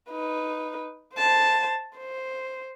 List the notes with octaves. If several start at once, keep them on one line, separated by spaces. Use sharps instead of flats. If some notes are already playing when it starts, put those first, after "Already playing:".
D#4 B4
C5 A5
C5